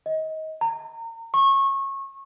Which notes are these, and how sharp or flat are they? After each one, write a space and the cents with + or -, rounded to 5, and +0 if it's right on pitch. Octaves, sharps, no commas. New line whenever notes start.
D#5 +25
A#5 -30
C#6 -25